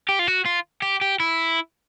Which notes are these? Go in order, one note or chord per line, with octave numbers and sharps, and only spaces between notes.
G4
F4
F#4
F4
G4
G4
E4